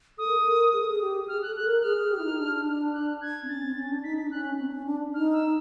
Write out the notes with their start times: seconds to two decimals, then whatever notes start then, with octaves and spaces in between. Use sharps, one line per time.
0.18 A4 D#6
0.27 A#4
0.35 A4
0.45 A#4
0.73 G#4
0.80 A4
0.89 G#4
1.01 G4
1.24 G4
1.28 G#4 F6
1.42 A4 F#6
1.56 F#6
1.64 A#4
1.79 F#6
1.83 G#4 F6
1.98 G#4
2.11 G4
2.19 E4
2.24 D#4
2.38 D4
2.93 F#6
3.21 G#6
3.43 C4
3.48 C#4 A6
3.63 C4
3.76 C#4
3.89 D4
4.03 D#4 B6
4.17 B6
4.24 D4
4.31 C#4 F#6
4.59 C4
4.68 D4
4.72 C#4
4.86 D4
5.14 D#4 F6
5.32 E6